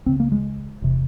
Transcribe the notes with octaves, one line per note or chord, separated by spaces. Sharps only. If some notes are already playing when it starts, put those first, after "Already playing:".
C#2 C#3 C4
A#3
G#3
E1 C3